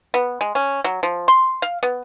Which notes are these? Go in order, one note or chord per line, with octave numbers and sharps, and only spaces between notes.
B3
G#3
C#4
F#3
F3
C6
F5
B3